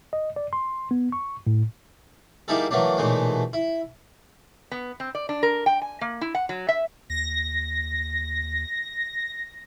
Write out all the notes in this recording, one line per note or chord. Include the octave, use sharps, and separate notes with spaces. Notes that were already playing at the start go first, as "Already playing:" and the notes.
D#5
D5
C6
B3
C#6
A2
G3 A#3 D#4 E4 G#4 A4
E3 F#3 A3 A#3 D4
B1 A#2 E3 G#3 A3
E4
B3
C4
D5
D4
A#4
G5
G#5
A#3
E4
F#5
F#3
E5
D#2 A#6